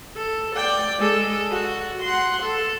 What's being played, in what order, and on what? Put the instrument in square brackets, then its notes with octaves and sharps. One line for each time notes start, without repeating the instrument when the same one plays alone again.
[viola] A4
D5 G5
G#3 A4
F#4
F#5 C6
A4